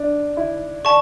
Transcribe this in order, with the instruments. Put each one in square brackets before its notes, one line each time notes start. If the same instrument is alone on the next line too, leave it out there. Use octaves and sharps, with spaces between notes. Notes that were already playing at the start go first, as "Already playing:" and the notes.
Already playing: [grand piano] D4
E4
[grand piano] D5 [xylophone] A5 C#6